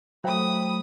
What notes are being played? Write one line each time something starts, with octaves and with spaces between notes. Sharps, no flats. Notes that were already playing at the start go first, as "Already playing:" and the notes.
F#3 A3 C5 E5 G5 B5 D#6